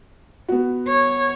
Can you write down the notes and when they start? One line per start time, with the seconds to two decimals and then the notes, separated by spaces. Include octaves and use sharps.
0.48 B3 F#4
0.88 C#5